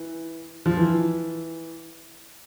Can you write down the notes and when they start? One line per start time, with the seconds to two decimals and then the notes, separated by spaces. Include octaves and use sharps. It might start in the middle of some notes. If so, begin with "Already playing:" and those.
Already playing: E3
0.66 F3
0.77 E3